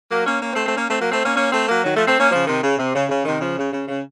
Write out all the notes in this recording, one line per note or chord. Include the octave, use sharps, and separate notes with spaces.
F#3 A#3
A#3 C#4
A#3 C#4
A3 C4
A3 C4
A#3 C#4
A3 C4
F#3 A#3
A3 C4
A#3 C#4
A#3 C#4
A3 C4
F#3 A#3
D#3 F#3
F3 A3
A3 C4
A#3 C#4
C#3 F3
C3 D#3
C#3
C3
C#3
C#3
C3 D#3
C#3 F3
C#3
C#3
C#3